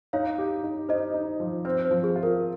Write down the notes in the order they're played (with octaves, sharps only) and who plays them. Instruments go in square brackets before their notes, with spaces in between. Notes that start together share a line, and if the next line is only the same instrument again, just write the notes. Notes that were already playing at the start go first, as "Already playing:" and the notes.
[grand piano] D#4 [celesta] C#5 F5
[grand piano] G4
D#4
[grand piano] D#4 [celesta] C5 D#5
[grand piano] D#4
F3
[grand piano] C4 [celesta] C5
[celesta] C5
[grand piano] F3
[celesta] G#4
[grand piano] F4
[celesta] A#4